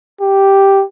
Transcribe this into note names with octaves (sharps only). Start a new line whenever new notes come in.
G4